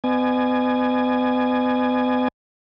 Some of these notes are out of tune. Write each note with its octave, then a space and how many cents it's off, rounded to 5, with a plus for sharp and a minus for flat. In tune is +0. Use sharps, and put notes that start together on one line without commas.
B3 +40 D#5 -40 G#5 +15